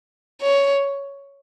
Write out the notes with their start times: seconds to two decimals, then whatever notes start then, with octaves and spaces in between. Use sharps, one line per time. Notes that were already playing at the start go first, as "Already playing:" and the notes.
0.42 C#5